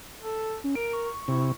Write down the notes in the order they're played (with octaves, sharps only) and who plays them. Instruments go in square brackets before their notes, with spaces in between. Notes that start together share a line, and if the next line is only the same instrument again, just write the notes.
[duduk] A4
[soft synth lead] C#4
[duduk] A#4 [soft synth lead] D7
[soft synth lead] C#6
[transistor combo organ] C3 [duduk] E4